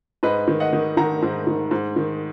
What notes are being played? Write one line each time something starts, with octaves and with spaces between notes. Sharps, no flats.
G#2 B4 D#5
D#3
D#5 F#5
D#3
D#3 F#5 A#5
G#2
D#3
G#2
D#3